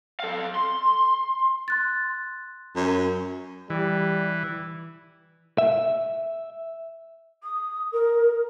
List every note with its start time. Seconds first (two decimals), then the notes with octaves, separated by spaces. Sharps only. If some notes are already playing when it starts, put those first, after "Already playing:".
0.20 A4 F5
0.55 C6
1.68 C6 F#6 A6
2.76 F#2
3.70 E3 G3
5.58 E5
7.44 D#6
7.93 A#4